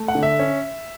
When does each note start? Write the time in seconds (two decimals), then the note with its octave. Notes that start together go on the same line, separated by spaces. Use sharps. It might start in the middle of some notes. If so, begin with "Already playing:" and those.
Already playing: A3
0.08 F#5
0.15 D3
0.23 E5
0.39 C#4